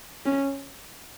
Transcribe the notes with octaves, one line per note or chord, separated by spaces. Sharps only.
C#4